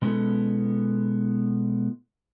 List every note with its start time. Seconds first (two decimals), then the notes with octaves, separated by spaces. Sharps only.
0.02 B2 G#3 B3 C#4 E4 A4